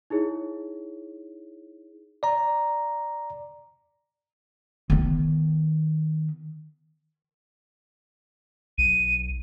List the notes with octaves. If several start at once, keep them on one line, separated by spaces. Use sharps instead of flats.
D#4 E4 G#4 C#5
D5 A#5
D#3 B3
B1 D#7